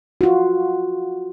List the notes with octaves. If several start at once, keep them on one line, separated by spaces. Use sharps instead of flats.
F4 F#4